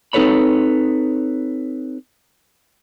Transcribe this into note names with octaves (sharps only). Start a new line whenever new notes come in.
C4 D#4 A4 B4 C#5 B5